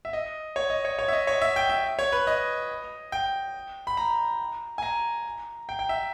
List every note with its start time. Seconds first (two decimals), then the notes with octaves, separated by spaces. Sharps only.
0.05 E5
0.13 D#5
0.56 C#5
0.70 D#5
0.85 C#5
0.99 C#5
1.08 E5
1.13 D#5
1.27 C#5
1.41 E5
1.56 G5
1.70 E5
1.99 C#5
2.12 B4
2.27 D#5
3.12 G5
3.87 B5
3.97 A#5
4.78 G#5
4.83 A#5
5.69 G5
5.79 G5
5.89 E5